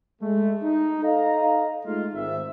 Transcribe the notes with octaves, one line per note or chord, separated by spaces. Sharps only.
G#3 A3
D#4
A4 D#5 F5 A#5
G#3 A3 D#4 F4
G#1 D#3 C4 E5